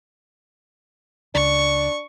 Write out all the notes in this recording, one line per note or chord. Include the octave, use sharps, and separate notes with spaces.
C#2 D4 C#6